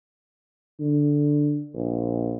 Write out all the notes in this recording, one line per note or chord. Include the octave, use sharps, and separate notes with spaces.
D3
A#1